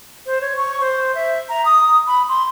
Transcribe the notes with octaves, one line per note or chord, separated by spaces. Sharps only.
C5
C#5
C#6
C5
E5
A#5
D#6
B5
C6